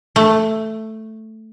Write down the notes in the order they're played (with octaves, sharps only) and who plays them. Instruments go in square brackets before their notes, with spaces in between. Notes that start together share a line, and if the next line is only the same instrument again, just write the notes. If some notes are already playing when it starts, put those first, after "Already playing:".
[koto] A3